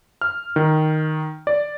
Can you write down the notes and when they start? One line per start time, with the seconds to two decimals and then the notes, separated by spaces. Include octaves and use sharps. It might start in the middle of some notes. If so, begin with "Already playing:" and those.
0.21 F6
0.56 D#3
1.47 D5